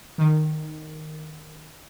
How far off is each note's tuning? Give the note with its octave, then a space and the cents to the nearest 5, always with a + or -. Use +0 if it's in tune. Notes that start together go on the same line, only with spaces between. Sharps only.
D#3 -10